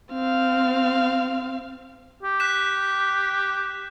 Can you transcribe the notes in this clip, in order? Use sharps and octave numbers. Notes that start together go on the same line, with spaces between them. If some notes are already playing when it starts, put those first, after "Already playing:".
C4 F5
G4
F#6 B6 E7